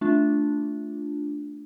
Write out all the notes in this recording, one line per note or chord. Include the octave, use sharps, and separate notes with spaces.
A3 D4 F4